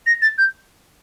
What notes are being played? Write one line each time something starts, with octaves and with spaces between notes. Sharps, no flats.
A#6
A6
G6